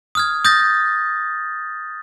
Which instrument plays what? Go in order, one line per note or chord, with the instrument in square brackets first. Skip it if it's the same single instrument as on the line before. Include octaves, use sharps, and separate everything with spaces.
[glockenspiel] D#6 F6 G#6
D#6 G6 A6 A#6